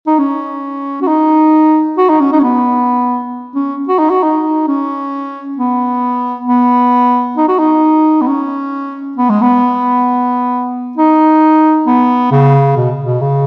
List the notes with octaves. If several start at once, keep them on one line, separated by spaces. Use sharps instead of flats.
D#4
C#4
F#4
D#4
F#4
D#4
C#4
D#4
C#4
B3
C#4
F#4
D#4
F#4
D#4
C#4
B3
B3
D#4
F#4
D#4
B3
C#4
B3
G#3
B3
D#4
B3
C#3
B2
B2
C#3